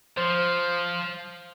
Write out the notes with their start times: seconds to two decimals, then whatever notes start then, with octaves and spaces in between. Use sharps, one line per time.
0.17 F3 C5